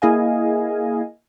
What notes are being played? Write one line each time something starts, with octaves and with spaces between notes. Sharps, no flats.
A#3 E4 G#4 D#5 F5 G#5